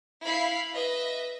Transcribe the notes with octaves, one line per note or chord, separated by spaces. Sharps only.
E4 F5 B5 C7
B4 D#5 E5